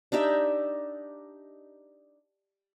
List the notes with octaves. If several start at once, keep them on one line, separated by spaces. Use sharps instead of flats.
D4 D#4 G4 E5